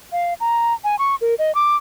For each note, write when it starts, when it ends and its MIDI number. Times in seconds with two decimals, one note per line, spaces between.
0.12 0.34 77
0.40 0.74 82
0.84 0.98 80
0.99 1.15 85
1.21 1.35 70
1.39 1.54 75
1.55 1.76 86